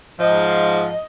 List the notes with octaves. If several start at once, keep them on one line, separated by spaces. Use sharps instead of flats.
G#2 F3 D#5